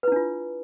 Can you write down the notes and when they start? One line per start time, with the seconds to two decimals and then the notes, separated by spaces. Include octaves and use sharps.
0.03 B4
0.08 E4
0.12 D4
0.16 F4